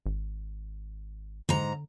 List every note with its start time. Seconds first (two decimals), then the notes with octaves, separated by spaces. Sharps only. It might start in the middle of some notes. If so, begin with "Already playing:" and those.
0.06 G#1
1.49 G#2 D3 A#5